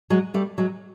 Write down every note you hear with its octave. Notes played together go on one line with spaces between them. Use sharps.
F#3 G#3
G3 A3
F#3 G#3